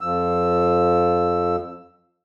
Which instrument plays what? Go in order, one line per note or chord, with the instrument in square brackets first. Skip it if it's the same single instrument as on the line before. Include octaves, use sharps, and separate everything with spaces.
[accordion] F2 F3 E6